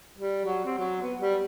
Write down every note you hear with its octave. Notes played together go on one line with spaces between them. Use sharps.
G3
F#3
C4
F#3
B3
G3